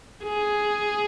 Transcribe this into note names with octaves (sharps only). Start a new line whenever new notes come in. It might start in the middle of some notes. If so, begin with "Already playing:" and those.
G#4